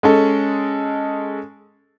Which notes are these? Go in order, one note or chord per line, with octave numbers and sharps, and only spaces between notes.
G#3 C#4 A4